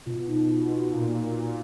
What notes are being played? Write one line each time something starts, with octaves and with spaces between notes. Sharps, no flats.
B2 F4
D#4
F4
F#4
A#2 F#4